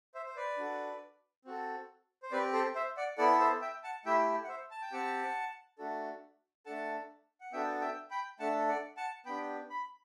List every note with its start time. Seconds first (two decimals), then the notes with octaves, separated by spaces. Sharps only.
0.15 C5 E5
0.25 C5
0.36 B4 D5
0.57 D4 F#4 A4
1.45 C4 F#4 A4
2.23 C5
2.31 C4 G4 B4 D5
2.53 A4 C5
2.75 C5 E5
2.97 D5 F#5
3.18 B3 E4 A4 D5 F#5
3.40 C5 E5
3.61 E5 G5
3.84 F#5 A5
4.05 A3 E4 G4 E5 G5
4.44 F#5
4.48 C5 E5
4.71 A5
4.82 G5
4.92 C4 G4 F#5 A5
5.79 A3 D4 F#4 A4
6.66 A3 D4 A4 F#5 A5
7.41 F#5
7.53 B3 D4 F#4 A4 E5 G5
7.81 E5 G5
8.10 G5 B5
8.40 A3 D4 A4 F#5 A5
8.68 D5 F#5
8.97 F#5 A5
9.26 B3 D4 G4 G5 B5
9.70 B5